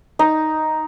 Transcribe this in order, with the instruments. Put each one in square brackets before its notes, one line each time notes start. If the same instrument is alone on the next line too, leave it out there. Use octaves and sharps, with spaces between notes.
[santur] D#4